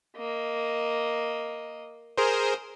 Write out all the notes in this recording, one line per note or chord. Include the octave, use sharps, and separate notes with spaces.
A#3 D#5
G#4 A#4 C5